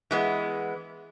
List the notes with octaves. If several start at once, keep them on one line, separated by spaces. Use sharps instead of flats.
E3 G#3 B3